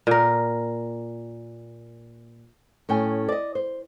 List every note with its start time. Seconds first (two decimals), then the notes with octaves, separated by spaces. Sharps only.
0.07 A#2 A#4
2.89 A2 C#4 G5 G#5
3.29 D5 D#5
3.55 C5